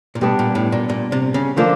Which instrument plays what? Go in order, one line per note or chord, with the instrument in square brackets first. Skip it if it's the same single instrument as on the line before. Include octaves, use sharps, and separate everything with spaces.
[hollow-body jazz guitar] A#2
[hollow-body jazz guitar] B2 [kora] G3 B3 D4
[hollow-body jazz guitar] A#2
A2
A#2
A#2
C3
C#3
[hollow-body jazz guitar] D3 [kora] F3 A#3